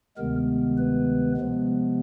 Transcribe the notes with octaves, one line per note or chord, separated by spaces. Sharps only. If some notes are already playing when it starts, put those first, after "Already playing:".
D2 C3 D#3 G#3 B3 A#4
B4
C3 F3 G#3 B3